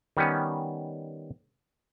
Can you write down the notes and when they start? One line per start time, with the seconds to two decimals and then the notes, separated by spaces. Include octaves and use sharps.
0.17 D#3 G3 B3 C#4